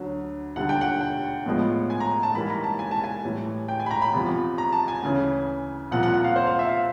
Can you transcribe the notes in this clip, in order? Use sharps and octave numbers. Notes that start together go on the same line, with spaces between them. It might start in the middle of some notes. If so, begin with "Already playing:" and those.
Already playing: D2 D3 F#3
D#2 D3 G3 F#5
G5
F#5
G5
A2 F3 G#3 B3
G#5
A#5
A5
G#2 E3 G3 A#3 B5
A#5
A5
G#5
A5
G#5
A2 E3 G3
G5
G#5
B5
A#5
B5
E2 C3 F3
A#5
A5
G#5
D2 C#3 E3
C2 A#2 F3 F#5
F#5
F#5
F5
C5
F5
E5
F5